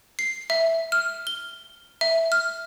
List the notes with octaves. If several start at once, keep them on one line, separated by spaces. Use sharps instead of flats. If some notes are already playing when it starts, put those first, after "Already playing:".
C7
E5
F6
G7
E5
F6